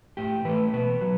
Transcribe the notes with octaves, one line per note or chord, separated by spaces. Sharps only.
A2 G4
E3 A3 B4
B2 B4
F#3